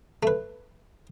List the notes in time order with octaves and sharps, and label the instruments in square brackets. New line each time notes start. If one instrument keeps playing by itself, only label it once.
[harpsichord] A3 B4